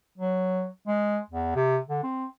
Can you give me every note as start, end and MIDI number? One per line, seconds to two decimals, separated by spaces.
0.18 0.68 54
0.87 1.19 56
1.30 1.51 40
1.56 1.78 48
1.89 2.02 50
2.03 2.25 60